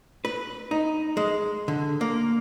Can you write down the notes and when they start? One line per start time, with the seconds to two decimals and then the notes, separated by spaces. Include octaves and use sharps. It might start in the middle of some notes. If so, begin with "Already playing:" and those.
0.25 B4
0.71 D#4
1.17 G#3
1.68 D3
2.01 A#3